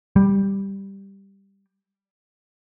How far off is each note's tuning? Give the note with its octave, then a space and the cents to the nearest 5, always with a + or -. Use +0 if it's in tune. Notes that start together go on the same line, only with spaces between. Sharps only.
G3 +5